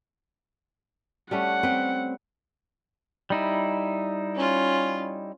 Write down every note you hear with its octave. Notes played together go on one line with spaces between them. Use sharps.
G3 A3 C#4 F#5
C4 B4 G5
G3 D#4 E4
C#4 F4